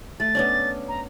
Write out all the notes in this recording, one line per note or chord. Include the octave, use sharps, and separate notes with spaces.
A3 A6
B3 C#4 D4
A#5